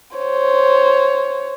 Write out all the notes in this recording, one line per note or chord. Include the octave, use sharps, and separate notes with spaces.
C5 C#5